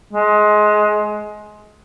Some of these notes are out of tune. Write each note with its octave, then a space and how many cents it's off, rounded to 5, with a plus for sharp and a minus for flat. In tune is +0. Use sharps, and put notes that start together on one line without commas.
G#3 +20